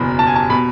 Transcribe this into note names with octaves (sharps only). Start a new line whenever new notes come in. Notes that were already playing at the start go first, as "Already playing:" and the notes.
Already playing: F#1 E2 B2 B5
A5
G#5
A5
B2 B5